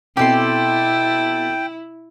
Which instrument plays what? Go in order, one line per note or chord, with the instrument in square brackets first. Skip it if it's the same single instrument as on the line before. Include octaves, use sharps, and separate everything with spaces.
[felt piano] B2 C4 [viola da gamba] E4 [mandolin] G4 A4 C6 [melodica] G5